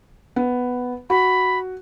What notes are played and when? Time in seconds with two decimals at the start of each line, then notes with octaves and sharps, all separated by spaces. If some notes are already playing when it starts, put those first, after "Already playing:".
0.36 B3
1.10 F#4 B5